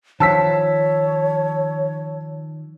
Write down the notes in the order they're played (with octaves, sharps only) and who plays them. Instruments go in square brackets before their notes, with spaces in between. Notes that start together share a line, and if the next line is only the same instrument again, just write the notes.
[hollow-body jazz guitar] D#3 F3 [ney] C#5 [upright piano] A5 E6 B6